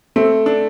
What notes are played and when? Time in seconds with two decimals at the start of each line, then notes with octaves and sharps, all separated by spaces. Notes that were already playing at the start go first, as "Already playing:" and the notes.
0.16 A3 C4
0.46 D4